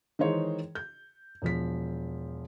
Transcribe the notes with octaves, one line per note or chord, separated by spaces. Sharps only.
D#3 E3 G#3 D#4 C5 C#5
G6
E1 F3 B6